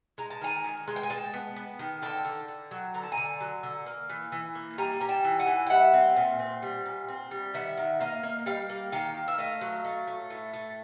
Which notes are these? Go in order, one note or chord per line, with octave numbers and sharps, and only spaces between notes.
G#3 A#5
A5
D#3 G#5 A#5
D#3
G#3
G5
G#5
G#3 G5 A5
B3
B3
D#3
D3 G5 A5
D3
D3
F#3
D3 A#5
A5
G#5 A#5
D3
F#3
D3
A#3
E3
E3
A#3
G3 G#5 A#5
G3 A#5
G5 A5
E3
F#5 G#5
E3
G5
G3 E5 F#5
C4
A#2
C4
G3
A#2
C4
G3
D#3 E5 F#5
D#3
A#3 D#5 F5
A#3
G3 F5 G5
A#3
D#3 F5 G5
D#3
E5
A3 D#5 F5
F#3
A3
A3
A2
A3